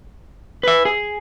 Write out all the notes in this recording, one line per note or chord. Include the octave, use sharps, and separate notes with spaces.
B4 E5
G#4